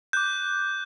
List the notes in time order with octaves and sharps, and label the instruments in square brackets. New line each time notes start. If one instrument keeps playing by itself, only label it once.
[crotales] D6 F#6 G6